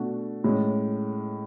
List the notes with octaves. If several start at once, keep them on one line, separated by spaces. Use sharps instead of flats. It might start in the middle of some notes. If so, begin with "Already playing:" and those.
Already playing: B2 A3 D4 F#4
A2 G#3 C#4